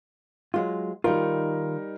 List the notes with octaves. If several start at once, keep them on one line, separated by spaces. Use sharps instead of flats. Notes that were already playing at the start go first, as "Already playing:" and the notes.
F#3 G#3 F4
D#3 G3 D#4 F4 A#4